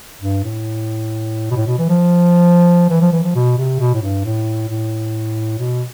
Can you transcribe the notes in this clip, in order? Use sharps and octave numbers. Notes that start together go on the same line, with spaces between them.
G2
A2
B2
A2
B2
E3
F3
E3
F3
E3
F3
B2
C3
B2
A2
G2
A2
A2
B2